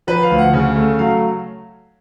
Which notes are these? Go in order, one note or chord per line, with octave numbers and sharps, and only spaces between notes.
F3 B4
F5
D2
F#5
C#3
A3
F#3 F5